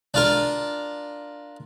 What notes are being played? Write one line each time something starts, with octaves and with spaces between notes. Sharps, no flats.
D4 F4 A#4